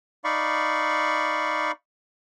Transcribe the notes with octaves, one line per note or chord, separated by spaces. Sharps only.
D#4 D5 F5 B5 C#6